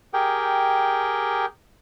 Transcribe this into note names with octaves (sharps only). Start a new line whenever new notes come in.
G4 G#4 A#4 G5